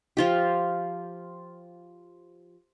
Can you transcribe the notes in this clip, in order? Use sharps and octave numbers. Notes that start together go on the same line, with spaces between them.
F3 F4 G4